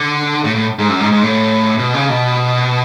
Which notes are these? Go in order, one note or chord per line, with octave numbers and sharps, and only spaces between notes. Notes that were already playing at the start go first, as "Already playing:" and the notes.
Already playing: D3
A2
A2
G#2
F#2
G#2
G#2
A2
B2
C#3
B2